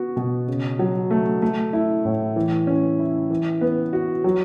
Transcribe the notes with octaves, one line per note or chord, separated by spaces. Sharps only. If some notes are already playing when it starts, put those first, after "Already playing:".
Already playing: B3 F#4
B2
C#3
F#3
A3
A3
E4
A2
E3
C#4
E4
E3
B3
F#4
F#3